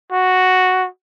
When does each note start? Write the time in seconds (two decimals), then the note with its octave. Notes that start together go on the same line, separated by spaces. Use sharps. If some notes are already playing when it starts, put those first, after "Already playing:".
0.12 F#4